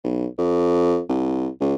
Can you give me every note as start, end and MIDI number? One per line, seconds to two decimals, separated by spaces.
0.04 0.26 35
0.38 1.01 41
1.09 1.48 36
1.61 1.76 37